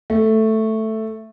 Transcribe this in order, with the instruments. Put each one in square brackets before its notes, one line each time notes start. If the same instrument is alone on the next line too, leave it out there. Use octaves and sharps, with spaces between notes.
[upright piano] A3